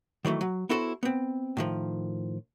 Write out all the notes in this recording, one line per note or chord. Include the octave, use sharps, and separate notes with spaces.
D#3 E3 F#3 A3
F#3
B3 E4 F#4 A4 A#4 C5
B3 C4
A2 D#3 F3